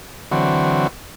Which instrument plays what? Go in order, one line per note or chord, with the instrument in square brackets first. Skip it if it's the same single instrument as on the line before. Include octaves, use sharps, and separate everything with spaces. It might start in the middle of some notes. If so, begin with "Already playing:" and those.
[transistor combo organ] D3 E3 F#3 C4 F#4